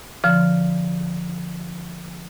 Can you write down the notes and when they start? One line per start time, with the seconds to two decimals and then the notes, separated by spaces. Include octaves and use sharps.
0.24 D3 F3 F6